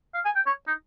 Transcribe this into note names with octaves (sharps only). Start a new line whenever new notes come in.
F5
G#5
G5
C#5
D#4